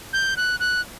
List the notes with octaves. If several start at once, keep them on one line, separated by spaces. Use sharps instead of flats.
G6
F#6
F#6